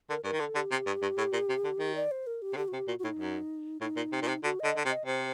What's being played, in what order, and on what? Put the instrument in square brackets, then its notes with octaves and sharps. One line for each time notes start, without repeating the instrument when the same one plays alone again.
[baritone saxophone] D3 [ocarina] A#4
[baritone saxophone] G2 [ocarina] A#4
[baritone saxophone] D#3
[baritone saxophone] D3 [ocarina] A4
[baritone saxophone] D3 [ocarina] G4
[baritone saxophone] C3
G2
G2
A2
A#2
C3
D3
D#3
[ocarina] D5
C5
A#4
G4
[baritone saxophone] C3
[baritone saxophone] D3 [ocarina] G4
[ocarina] F#4
[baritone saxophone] C3 [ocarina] G4
[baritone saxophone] A#2 [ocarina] F#4
[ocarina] F#4
[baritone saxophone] A2 [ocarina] D#4
[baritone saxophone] F#2
[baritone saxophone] A2 [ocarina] D#4
[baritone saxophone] A#2
C3
A#2
C3
[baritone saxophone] D3 [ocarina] F#4
[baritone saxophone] D3 [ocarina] D#5
[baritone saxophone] D3
C3
[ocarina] D#5
[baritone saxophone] C3 [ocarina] C5